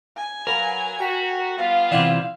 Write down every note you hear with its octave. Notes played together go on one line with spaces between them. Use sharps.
G#5
F#3 A#4 B4 F5 B5
F#4 G5 A#5 B6
G3 B3 F4 F5
C3 E3 D5 E5 F#5